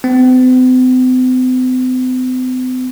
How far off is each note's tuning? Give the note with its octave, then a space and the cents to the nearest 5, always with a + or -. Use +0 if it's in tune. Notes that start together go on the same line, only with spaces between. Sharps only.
C4 -45